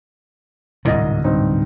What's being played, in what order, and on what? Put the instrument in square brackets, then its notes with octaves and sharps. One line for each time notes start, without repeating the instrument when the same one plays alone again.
[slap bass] D1 G#2 C3 [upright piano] C2 D#5
[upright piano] G2 C4 D#4